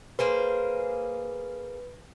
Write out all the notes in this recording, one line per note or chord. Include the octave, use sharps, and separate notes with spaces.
A#3 G#4 B4 C5